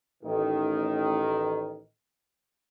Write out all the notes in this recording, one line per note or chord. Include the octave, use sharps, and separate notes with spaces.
A1 D#3